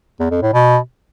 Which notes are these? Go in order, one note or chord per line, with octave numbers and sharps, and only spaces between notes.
E2
F2
A2
B2